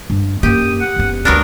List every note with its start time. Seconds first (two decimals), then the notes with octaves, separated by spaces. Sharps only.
0.10 G2
0.43 F#2 A#3 G4 D#6
0.81 F#5
0.96 F#1 B3
1.25 D2 F#3 G#3 B3 D4 A#4